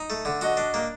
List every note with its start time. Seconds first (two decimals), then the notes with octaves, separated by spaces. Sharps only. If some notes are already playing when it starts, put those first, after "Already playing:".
Already playing: D#4
0.10 A3
0.25 D3
0.41 F#4 D#5
0.57 D4
0.74 A#3